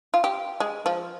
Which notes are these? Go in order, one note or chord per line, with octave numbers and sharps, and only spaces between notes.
F4
G4
G#3
F3